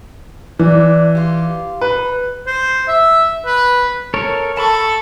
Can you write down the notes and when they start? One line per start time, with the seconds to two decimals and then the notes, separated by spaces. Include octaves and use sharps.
0.59 E3 D4
1.15 F4 G4
1.81 D#4 B4
2.47 C5
2.88 E5
3.46 B4
4.14 A4 A#4 C#5
4.57 A4 A5 B5 C#6